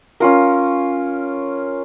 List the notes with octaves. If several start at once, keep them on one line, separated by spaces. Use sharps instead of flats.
C#4 F4 A#4